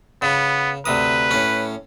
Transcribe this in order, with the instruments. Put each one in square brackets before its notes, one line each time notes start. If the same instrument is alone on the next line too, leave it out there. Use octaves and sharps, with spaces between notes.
[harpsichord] C#3 [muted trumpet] B3
[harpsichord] D2 C3 D#6 [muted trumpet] B4
[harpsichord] A2 C#4